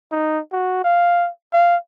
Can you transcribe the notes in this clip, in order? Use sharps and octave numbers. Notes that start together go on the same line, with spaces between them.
D#4
F#4
F5
F5